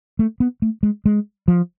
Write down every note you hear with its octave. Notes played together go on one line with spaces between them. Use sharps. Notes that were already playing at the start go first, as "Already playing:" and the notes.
A3
B3
A3
G#3
G#3
F3